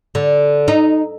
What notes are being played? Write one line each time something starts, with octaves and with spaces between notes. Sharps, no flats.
D3
D#4